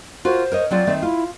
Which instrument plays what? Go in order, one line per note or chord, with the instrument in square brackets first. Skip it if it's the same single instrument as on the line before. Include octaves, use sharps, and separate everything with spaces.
[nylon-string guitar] F4 F#4 A#4 [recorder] C5
[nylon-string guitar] A#4 C#5 D#5
[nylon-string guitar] F#3 C4 F4 [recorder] D5
[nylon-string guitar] D#3 A3 C4
[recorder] E4 [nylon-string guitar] F4